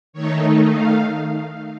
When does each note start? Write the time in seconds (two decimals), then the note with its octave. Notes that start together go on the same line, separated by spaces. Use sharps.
0.13 D#3 A3 D#4 C#5
0.66 F5